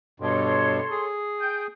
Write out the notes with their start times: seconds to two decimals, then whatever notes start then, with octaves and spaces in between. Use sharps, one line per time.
0.20 G2 B2 A4 C#5 C6
0.91 G#4
1.38 G5 D#6 G6